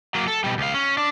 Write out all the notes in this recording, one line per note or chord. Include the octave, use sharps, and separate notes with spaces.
F#3 A#3
A4
B2 G3
C#2 F5
C#4
D4